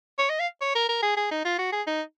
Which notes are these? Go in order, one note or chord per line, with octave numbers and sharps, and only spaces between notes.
C#5
D#5
F5
C#5
A#4
A#4
G#4
G#4
D#4
F4
F#4
G#4
D#4